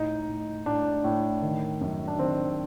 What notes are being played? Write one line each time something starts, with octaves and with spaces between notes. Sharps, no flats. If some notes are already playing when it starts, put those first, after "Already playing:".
Already playing: A2 D#4
A2
A2 D4
A2
D#3
F#2
D4
D#3 C4